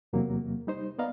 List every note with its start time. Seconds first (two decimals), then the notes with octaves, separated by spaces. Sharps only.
0.13 E2 C3 F#3 A#3
0.67 G3 D#4 C5
0.99 B3 D5 D#5 F5 A#5